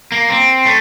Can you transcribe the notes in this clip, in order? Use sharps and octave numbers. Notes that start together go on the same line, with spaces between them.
A#3
C4
A3